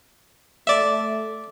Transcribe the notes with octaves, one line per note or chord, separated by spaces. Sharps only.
A3 D5 E5